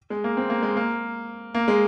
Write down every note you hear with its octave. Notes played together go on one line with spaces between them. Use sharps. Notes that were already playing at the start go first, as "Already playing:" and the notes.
G#3
A#3
C4
A#3
G#3
A#3
A#3
G#3